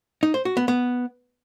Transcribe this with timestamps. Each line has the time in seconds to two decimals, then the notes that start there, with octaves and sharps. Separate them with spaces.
0.23 D#4
0.34 C5
0.45 F#4
0.57 B3
0.68 B3